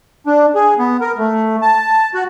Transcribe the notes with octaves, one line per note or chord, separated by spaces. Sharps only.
D4
G#4
B3
A#4
A3
A5
F#4